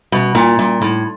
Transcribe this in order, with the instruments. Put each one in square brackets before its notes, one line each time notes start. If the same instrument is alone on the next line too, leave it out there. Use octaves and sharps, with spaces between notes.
[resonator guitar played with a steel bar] B2 [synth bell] G3
[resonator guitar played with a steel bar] A#2 [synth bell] A#3
[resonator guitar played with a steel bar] A#2 [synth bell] G3
[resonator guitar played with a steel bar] A2 [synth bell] D#4